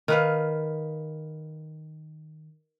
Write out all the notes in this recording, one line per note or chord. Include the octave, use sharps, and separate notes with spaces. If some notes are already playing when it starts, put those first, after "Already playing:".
D#3 B4 F5